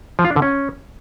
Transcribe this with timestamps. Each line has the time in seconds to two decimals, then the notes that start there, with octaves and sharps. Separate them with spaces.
0.19 F3
0.25 F4
0.30 D4
0.36 D3
0.42 C#4